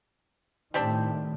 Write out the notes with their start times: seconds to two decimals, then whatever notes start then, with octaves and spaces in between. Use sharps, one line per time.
0.74 A2 D#3 G3 C4 D4